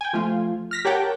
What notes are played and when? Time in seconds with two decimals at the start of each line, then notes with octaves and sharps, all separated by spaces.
0.01 G5 G#5
0.13 F3 A3 F4
0.71 F6 A#6 B6
0.85 G4 A#4 C#5 F#5 G5 A5